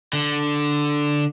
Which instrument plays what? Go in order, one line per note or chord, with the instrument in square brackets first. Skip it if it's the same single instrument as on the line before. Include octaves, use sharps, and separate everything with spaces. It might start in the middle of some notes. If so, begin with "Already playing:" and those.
[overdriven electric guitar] D3